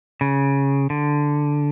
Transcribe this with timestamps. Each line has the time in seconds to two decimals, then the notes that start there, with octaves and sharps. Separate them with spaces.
0.21 C#3
0.90 D3